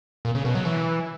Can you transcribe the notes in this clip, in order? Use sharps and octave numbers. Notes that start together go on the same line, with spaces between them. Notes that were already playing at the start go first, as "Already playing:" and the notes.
A#2
C#3
B2
F#3
E3